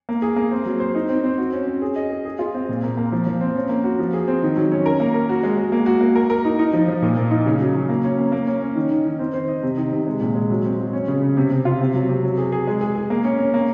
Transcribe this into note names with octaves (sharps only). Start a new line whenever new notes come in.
A#3
G#4
A#3
C4
F#3
C5
D#4
C4
C4
F#4
C#4
C#4
G#4
D#5
G#4
G#4
F4
C4
A#2
A#3
A#3
F3
F3
C4
C#4
A#3
F#4
F3
G#4
C4
D#3
F#3
C#4
A#4
A#3
A#4
F#4
G#3
G#3
A#3
F#4
A#3
A#4
A#4
D#4
D#4
F3
F3
A#2
A#3
D#4
C#3
F#3
F#3
A#3
C#4
A#3
A#3
C#4
C#4
D#3
D#3
D#3
C4
C5
D#5
C3
D#3
C3
G#3
A#2
G#3
F#3
C4
F#3
C#4
C#3
C#3
C3
C3
F4
C3
F#3
C3
F#3
G#4
G#4
G#3
G#4
G#4
A#3
C#4
C#4
A#3